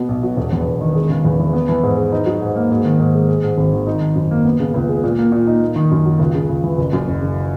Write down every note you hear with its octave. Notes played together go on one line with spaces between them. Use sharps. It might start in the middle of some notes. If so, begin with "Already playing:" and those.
Already playing: B2 B3
B1
F#3
E1
E2
E1
D#3
G#3
C#3
E2
E3
B3
E3
G#2
G#3
D#4
F#3
G#2
A#3
G#2
D#3
G#2
G#3
G#3
G#2
G#1
D#3
D#4
D#3
F#2
A#3
B3
C#3
C#2
G#3
A#2
A#3
A#2
D#4
A#3
D#3
F#2
F#3
C#2
C#3
C#2
E3
F#1
F#2
F#1
C#3